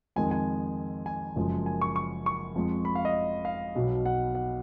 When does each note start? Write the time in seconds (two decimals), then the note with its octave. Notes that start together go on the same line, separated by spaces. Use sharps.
0.16 F2 D#3 G#3 G#5
0.31 G#5
1.06 G#5
1.35 F#1 F#2 F3 G#3
1.66 G#5
1.82 C#6
1.96 C#6
2.26 C#6
2.55 F2 F3 G#3
2.85 B5
2.95 F5
3.05 D#5
3.45 F5
3.75 B1 B2 F#3
4.06 F#5
4.35 F#5